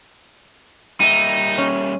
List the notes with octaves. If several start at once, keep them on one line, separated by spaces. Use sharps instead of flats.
G3 A#3 D#4 E5 D#7
C#4